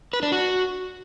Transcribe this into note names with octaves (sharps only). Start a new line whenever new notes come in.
B4
D4
F#4